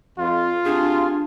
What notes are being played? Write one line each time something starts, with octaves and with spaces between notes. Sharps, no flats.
F2 F4
C3 D4 F#4 G#4